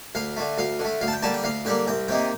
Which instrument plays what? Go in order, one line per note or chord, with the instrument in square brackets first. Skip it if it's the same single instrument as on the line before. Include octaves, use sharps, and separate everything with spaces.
[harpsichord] D2 F5
D3 A3
D2 F5
D3 A3
D2 F5
A5
G5
D3 G3 A#3 A5
G5
D2 F5
D3 G3 A#3 G5
C2 G5
C3 D#3 A#3 G5